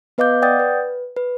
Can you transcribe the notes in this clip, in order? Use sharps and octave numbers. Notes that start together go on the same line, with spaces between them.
B3 B4 D#5 F5 D6 G6
D5 F#5 G5 D#6 G6 A6
B4
B4